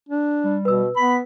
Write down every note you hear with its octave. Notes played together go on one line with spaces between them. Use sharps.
D4
G3
B2 B4 E6
B3 B5 B6